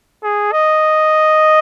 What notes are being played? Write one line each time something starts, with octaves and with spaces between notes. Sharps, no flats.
G#4
D#5